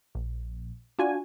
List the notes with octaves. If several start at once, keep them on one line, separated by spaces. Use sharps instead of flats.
A#1
D4 F4 F#4 G#5